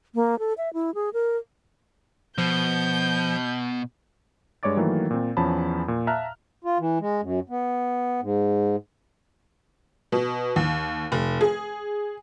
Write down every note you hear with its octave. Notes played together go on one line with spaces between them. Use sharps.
A#3
A4
E5
E4
G#4
A#4
B2 F3 G6
G2 G#3 C#5 D5 D6 A6
D#3 E3 F#3 A3 A#3
A#2 C4
E2 F3 C#4 G#5 A5 B5
A#2
E5 F5 A5 A#5 F6 F#6
F4
E3
G#3
F#2
B3
G#2
B2
D#2
F1
G#4